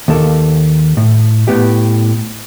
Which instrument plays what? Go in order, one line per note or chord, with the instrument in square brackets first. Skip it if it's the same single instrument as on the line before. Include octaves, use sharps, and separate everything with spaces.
[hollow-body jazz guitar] D#2 A#3 A4
A2
A2 B3 G4